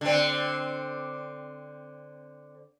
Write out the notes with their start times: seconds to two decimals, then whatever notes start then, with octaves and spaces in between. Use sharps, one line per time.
0.01 D3 C4